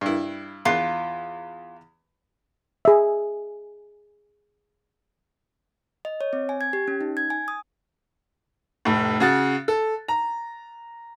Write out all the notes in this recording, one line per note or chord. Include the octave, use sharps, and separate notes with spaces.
G2 E4
E2 F4 C6 F#6
G#4 E5
D#5
C#5
C4
G#5
G#6
G4
C#4
D#4
G#6
G#5
D#6
F1 A2
C#3 F#4 A6
A4
A#5